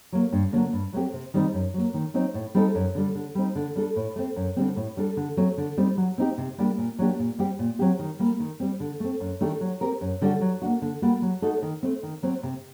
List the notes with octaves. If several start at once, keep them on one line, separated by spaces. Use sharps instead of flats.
F#3 A#3
G2
D3 F#3 A#3 D4
G2
F#3 A3 C4 G4
C3
D#3 G3 C4 D#4
F#2
F#3 A#3
D#3
F#3 C4 D#4
A2
G3 C4 D#4 A4
F#2
D3 G3
D3
G3 C4 D#4
D3
G3 D4 A4
A2
A3 C4
F#2
D3 G3 C4
A2
G3 D4 A4
D3
F#3 A3 C4
D3
G3 C4 D#4
F#3
C4 D#4 G4
C3
G3 A#3 D4 G4
A#2
F#3 A#3 D4 G4
A#2
G3 C4 G4
A#2
F#3 C4 G4
D#3
G3 A#3
D#3
G3 C4
D3
A3 C4
F#2
D#3 A3 D4 G4
F#3
C4 G4 A#4
F#2
D3 G3 D4 F#4
F#3
A#3 D4 F#4
D3
G3 A#3 F#4
F#3
A3 D#4 F#4 A4
D#3
A3 C4
D#3
F#3 C4
C3